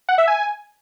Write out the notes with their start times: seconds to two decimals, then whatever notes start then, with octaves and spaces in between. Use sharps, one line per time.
0.09 F#5
0.18 E5
0.28 G#5